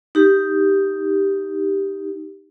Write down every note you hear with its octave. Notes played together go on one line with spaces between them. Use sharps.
D#4 G4